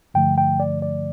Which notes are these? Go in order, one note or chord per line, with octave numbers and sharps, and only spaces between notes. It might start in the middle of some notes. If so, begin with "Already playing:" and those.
G2 D3 F3 A3 G5
G5
D5
D5